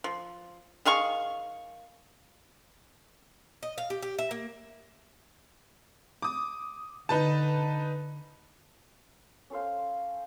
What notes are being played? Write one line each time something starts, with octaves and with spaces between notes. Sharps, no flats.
F3
D#3 G#4 F5 C#6
D#5
F5
G4
G4
E5
A#3
D6 D#6
D3 D#4 B4 A5
C#4 A4 C5 F5